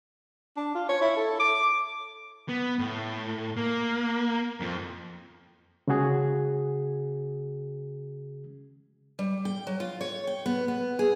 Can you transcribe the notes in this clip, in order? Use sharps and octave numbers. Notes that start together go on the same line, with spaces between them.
D4
F4
C#5
E4
A4
D6
B3
A2
A#3
F2 F3
C#3 G#3 C#4 F#4 G#4
G3
G5
F#3
F4
C#5
G5
B3
B3
G#4